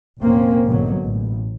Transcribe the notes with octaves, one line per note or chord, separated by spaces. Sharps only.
F1 A#2 A#3 C4 C#4
B1 G#2 B2 D3 F#3
A1